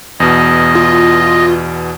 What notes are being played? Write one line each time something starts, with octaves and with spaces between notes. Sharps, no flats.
E2 B2 D#5
F4